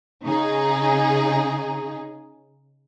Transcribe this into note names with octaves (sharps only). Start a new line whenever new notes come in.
C#3 D#4 G#4